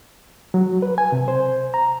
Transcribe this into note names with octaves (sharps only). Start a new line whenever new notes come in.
F#3
B4
G#5
C3
C5
A#5